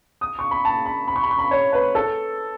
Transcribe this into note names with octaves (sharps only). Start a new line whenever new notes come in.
D#6
C#6
B5
A5
B5
B5
C#6
B5
C#6
B5
C#5
B4
A4